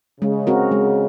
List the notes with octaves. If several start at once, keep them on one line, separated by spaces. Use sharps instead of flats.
C#3 G#3
C4 F#4 A#4
G#3